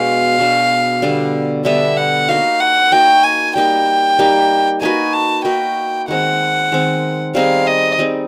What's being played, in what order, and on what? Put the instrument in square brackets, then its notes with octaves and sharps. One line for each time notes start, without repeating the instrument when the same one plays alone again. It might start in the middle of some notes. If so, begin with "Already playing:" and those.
Already playing: [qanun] B2 G#3 B3 D4 [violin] F5
[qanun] B2 G#3 B3 D4
D3 G3 B3 D4
[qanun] D3 G3 B3 D4 [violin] E5
[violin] F#5
[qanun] A#3 D#4 F#4 [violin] F5
[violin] F#5
[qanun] A#3 D#4 F#4 [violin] G5
[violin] G#5
[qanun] G3 A#3 D#4 G4 [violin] G5
[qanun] G3 A#3 D#4 G4
[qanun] A#3 D#4 F#4 B4 [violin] G#5
[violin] A5
[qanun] A#3 D#4 F#4 B4 [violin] G5
[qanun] D#3 G#3 C4 [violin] F#5
[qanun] D#3 G#3 C4
[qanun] G3 C4 D#4 G#4 [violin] F5
[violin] D#5
[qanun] G3 C4 D#4 G#4